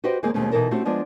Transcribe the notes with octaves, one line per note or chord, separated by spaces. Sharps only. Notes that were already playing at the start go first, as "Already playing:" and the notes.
F#4 G4 B4 C5 D#5 G5
D#2 G#3 A#3 C4 G#4
D#2 B2 G#3 A3 C4 C#4
B2 E3 D#4 A4 A#4
A3 C4 C#4 F#4 G4
F3 G#3 B3 D4 F4